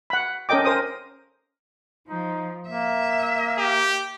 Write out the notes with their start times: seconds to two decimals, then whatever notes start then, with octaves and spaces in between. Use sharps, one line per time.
0.10 F#5 B5
0.49 C#4 A4 A#4 D#5 G5 D6
0.65 A#4 C5 D#6
2.08 F3 D#4
2.69 A#3 E5
3.58 G4